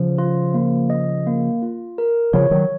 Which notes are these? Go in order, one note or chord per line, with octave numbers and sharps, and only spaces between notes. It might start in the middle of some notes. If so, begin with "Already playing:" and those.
Already playing: C#3 F3
F4
A#3
D#5
A#3
F4
A#4
C#3 F3 C#5
D#3 F#3